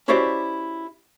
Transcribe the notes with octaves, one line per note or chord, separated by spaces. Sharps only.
C#4 E4 F#4 G4 C5 D5